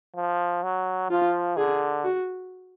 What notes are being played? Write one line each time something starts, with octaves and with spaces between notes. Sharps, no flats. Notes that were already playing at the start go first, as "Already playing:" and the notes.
F3
F#3
F3 F4
D3 G#4
F#4